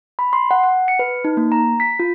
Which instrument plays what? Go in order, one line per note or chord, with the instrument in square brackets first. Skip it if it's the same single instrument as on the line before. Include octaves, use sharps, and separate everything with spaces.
[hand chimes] B5
C6
F#5
F#5
C#7
B4
D#4
A#3
A#5
B6
F4